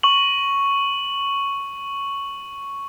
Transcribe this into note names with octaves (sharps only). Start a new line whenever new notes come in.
C#6 F#7